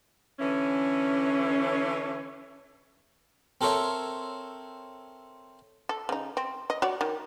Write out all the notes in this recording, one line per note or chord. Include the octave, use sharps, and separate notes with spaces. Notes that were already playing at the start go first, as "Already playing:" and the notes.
D3 E3 C#4
C4 A4 A#4 C5 C#5 E5
A4
C#3 D#4
C4
D#5
F#4 C#5 D5
D#3